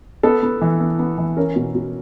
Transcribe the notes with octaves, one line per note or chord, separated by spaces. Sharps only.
B3 A4
B3
E3
B3
B3
E3
C#4 A#4
B2
B2